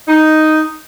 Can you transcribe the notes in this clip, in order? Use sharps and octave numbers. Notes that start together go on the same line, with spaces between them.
D#4